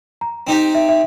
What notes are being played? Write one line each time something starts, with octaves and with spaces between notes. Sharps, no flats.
A#5
C4 D#4 G4
E5
E5